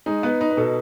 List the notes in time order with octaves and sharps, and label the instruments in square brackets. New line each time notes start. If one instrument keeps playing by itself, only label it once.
[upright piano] G#3 [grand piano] D#4
[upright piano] B3 [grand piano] B4
[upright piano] D#4 [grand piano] B4
[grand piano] B4
[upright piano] B2 [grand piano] A4